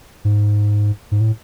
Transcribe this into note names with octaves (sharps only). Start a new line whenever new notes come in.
G#2
G#2
A2